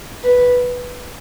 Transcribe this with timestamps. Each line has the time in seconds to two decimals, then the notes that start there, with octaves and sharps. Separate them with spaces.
0.23 B4